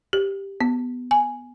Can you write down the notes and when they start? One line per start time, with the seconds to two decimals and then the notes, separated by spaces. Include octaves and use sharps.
0.13 G4
0.61 B3
1.11 G#5